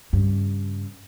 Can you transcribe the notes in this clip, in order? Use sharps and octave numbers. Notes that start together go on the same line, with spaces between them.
G2 C#3